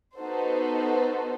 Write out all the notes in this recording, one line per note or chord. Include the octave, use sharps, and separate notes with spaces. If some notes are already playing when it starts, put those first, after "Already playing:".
B3 D#4 F#4 A4 C5